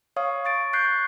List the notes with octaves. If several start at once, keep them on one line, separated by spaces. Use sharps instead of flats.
C#5 F5 C#6 D#6
C#6 A6 D7
C#6 F#6 G6 C7